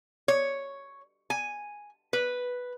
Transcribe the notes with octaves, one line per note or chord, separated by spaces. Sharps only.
C#5
G#5
B4